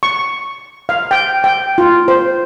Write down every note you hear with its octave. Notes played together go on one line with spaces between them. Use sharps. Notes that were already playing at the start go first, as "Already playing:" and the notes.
C#6
F5
G5
G5
F4
C5